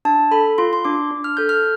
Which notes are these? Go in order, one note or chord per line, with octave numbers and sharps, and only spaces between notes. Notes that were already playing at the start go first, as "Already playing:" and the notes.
D4 A5
A4 B5
F4 C6
C6
D4 D6
D4
F6
A4 G6
F6